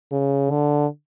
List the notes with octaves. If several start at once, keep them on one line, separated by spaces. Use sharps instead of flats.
C#3
D3